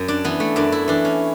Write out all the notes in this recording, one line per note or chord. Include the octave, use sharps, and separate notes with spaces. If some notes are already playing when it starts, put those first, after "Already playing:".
Already playing: F#2
D4
E3 B3
A3
F#2 D4
E4
E3 D4
C#4